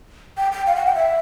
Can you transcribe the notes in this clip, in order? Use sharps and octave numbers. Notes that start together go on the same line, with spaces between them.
G5
G5
F5
F#5
G5
E5